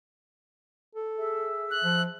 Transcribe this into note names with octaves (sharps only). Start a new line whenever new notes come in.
A4
G#4 E5 E6
F#6
F3